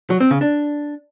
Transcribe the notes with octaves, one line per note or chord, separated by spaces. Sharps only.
F#3
C4
C#3
D4